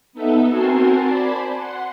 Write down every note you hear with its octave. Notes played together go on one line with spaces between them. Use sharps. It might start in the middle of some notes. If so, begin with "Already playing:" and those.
B3 D#4 A4 E5
C4 F#4 A#4 G#5 A5 C6
C5 D5 G#5 A5 B5
F#5 C6